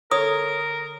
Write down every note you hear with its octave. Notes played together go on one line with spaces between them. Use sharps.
D3 A#4 C#5 D#6